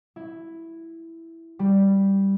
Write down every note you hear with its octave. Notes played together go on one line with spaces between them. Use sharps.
E4
G3